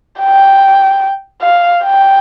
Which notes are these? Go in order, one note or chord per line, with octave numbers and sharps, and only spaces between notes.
G5
F5
G5